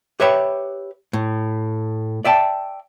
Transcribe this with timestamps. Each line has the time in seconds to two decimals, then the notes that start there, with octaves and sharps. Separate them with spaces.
0.20 G4 B4 C#5 E5 G5 B5
1.13 A2
2.25 D5 E5 G5 A5